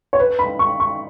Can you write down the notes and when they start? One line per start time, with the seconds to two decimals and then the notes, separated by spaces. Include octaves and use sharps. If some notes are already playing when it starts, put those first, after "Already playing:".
0.13 C#5
0.19 B4
0.39 B5
0.59 C#6
0.80 C#6